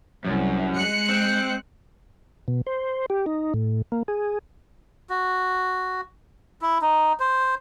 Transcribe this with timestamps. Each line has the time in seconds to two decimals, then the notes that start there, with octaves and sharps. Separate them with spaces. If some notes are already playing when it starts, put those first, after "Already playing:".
0.25 C2 F#2
0.76 G#3 F#6 C#7
1.09 C4
2.48 B2
2.67 C5
3.10 G4
3.26 D#4
3.54 A2
3.92 A#3
4.08 G#4
5.10 F#4
6.62 E4
6.82 D#4
7.20 C5